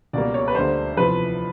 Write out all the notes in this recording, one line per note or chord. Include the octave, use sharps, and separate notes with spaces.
C#2 B2 G3 A#3 D5
C#5
B4
D2 D3 G3 A#3 C5
E2 C3 F3 B4